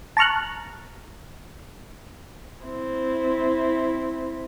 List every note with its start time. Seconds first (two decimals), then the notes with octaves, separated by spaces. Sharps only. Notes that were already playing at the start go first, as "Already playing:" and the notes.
0.17 A5 A#5 C#6 F6 F#6
2.65 C4 E4